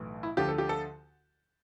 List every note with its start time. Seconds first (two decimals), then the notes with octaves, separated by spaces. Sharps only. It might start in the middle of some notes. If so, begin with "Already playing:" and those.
Already playing: B1 A2 E3
0.23 E4
0.37 D2 D3 F3 G4
0.48 A4
0.58 G4
0.69 A4